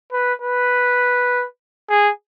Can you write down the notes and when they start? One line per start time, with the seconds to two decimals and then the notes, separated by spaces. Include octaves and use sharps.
0.13 B4
0.42 B4
1.89 G#4